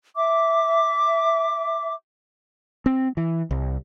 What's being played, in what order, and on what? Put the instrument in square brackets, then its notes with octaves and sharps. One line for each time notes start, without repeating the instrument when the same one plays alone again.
[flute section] E5 D6
[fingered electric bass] C4
E3
C2